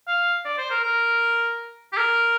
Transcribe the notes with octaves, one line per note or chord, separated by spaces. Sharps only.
F5
D5
C5
A#4
A#4
G4
A#4